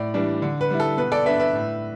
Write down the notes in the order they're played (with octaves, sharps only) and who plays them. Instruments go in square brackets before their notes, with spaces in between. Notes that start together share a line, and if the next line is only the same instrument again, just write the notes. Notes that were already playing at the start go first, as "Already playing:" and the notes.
Already playing: [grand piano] A2 D5
E3 G3 D4
D3
B4
G3 E4
A4
B2 B4
A4 D5
B3 D4 B4 E5
B4 E5
A2